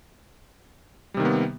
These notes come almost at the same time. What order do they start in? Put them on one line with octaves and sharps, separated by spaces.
G3 C3 D#3 A#3 B3